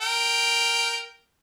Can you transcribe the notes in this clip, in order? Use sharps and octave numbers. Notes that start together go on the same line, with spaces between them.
A#4 G5